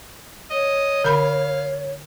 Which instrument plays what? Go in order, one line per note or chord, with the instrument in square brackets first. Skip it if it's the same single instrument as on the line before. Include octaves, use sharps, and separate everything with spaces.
[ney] C#5 [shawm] D#5
[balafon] D3 B5 [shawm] F5